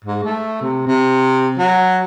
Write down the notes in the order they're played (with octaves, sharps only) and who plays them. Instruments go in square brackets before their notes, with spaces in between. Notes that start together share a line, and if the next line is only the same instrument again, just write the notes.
[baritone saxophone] G#2
A3
C3
C3
F#3